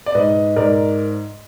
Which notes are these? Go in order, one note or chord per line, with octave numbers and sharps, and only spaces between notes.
D5
G#2 B4 D#5
G#2 A#4 D5